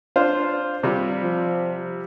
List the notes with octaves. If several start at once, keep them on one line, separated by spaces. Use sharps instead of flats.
D4 F4 C5
C3 G3 F4
F3